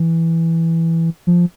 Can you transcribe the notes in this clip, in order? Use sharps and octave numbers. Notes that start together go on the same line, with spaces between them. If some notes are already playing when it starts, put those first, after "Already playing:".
Already playing: E3
F3